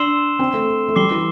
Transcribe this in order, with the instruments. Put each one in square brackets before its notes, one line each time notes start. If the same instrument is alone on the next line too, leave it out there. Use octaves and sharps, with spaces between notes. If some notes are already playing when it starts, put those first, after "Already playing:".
Already playing: [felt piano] D4 [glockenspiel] C6 E6 C7 E7 G7
[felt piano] C4
A3
A3
[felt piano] G3 [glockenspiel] D6 C7 G7
[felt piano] E3